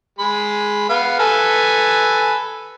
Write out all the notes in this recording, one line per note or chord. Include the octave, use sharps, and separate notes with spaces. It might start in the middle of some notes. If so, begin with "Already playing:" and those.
G#3 B5
B3 F5
A4 B4 G#5